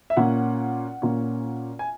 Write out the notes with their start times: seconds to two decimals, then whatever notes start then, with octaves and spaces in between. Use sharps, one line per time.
0.10 E5
0.17 A#2 A#3 C#4 F#5
1.02 A#2 A#3 C#4
1.79 G#5